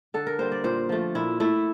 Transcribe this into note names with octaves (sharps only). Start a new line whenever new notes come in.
D3 A4
A#4
G3 A#3 C5
D5
A#2 C5
F3 A3
A#2 E4
A3 E4